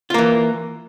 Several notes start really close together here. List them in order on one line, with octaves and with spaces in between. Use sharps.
F4 A#3 E3